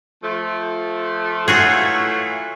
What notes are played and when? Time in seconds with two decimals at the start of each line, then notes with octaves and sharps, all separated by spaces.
0.23 F3 A3
1.48 E3 F#3 A3 F4 F#4 G#4